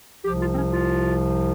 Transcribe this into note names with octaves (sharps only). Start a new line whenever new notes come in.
C2 C3 F3 G4
F4
C4
C#4
F4